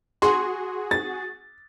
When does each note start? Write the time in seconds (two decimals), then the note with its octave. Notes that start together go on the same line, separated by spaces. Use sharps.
0.22 F#4 G#4 C6
0.91 A6